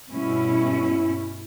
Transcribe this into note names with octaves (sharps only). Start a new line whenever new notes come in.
G2 B2 C#4 E4